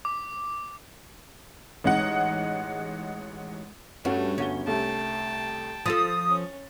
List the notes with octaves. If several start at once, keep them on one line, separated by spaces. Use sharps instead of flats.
D6
A1 G#3 D#4 F#5
G2 A3 C#4 F#4
G1 C#4 F#4 G7
C2 A3 G5 A5
F3 F4 A4 D#6 A6
C#4